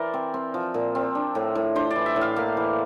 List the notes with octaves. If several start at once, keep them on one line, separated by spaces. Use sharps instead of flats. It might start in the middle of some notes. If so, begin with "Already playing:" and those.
Already playing: E3 A#4 C5 D5
C4
C4
F3
A#2
C4
D4
A2
A2
D4 C5
D5
E3
E5
A2
F5
A#3 F5
E3